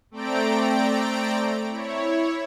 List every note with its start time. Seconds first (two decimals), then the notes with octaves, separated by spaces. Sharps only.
0.11 A3 C4 D5 G5 A#5 D7
1.70 E4 C#5